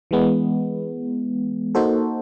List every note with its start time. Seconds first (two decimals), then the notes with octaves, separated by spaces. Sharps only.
0.11 E3 G#3 B3
1.75 A#3 D#4 F#4 A4 C5